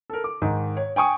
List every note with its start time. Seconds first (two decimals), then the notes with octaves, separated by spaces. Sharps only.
0.10 A4 A#4
0.24 D6
0.42 G#2 D#3
0.77 C#5
0.96 G5 G#5 C#6 D#6